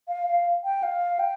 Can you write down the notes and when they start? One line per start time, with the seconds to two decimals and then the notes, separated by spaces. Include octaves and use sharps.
0.08 F5
0.27 F5
0.64 G5
0.83 F5
1.19 G5